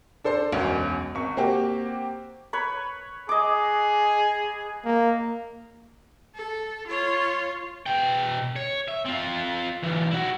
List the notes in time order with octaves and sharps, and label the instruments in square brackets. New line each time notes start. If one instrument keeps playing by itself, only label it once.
[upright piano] D4 A4 C5 C6
E1 B1 F#2 C#4 G#5
G#1 C#6
A#3 C4 F#4 G4
[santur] B4 C#5 B5
[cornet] G#4 [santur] D#5 D6
[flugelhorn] A#3
[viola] A4
F4 C#5
[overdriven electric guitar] B2 G5
C#5
E5
C4 F4
B1 E2
E4 F#4